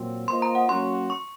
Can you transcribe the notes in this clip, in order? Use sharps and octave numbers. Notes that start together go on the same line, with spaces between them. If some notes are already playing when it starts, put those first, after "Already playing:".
Already playing: A#2 F#3 C4
A#3 F4 C5 D#5 C6
A#5
F#5
F#3 A#3 C#4 F#4 C6
C#6